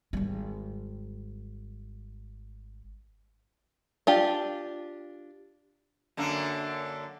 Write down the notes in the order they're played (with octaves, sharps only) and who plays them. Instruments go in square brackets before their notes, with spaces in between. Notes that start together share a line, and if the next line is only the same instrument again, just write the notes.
[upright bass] G#1 G3
[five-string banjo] D4 F4 G4
[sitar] F#2 D3 A#3